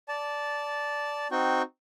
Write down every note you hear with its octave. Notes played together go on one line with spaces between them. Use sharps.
D5 A5
C4 D#4 F#4 G5